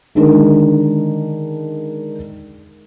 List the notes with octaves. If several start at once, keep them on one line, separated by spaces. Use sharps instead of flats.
D3 D#3 G#3 D4 A#4